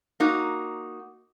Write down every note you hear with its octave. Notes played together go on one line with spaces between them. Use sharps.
A#3 D#4 F#4